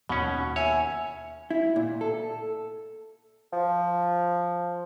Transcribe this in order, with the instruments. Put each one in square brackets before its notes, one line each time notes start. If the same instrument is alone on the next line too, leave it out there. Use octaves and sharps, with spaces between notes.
[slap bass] D#2 [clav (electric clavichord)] B2 C#4 [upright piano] F#5
[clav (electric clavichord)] C#5 [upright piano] E5 G#5
[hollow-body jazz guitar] E4
A#2
A4
[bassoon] F3